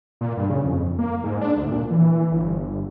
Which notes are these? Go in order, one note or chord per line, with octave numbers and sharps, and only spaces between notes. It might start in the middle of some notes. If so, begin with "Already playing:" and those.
A#2
G2
C#3
F2
A#3
G#2
D4
D2
A#2
E3
G1